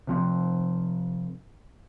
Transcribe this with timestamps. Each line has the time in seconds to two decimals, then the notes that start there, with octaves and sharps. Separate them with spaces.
0.07 C3 F3 C4